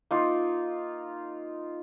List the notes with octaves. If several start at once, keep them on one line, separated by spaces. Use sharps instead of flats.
A#3 D#4 F4